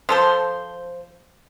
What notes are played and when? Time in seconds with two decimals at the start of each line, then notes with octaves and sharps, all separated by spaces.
0.09 F3 A4 C5